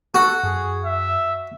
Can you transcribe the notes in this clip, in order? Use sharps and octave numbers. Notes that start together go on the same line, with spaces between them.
F#4 A4
F#2 G#4
E5